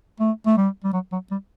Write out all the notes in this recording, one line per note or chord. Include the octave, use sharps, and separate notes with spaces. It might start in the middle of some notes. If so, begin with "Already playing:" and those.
A3
A3
G3
G3
F#3
F#3
G3